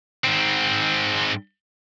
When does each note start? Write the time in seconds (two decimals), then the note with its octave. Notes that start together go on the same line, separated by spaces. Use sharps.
0.25 G#2 C4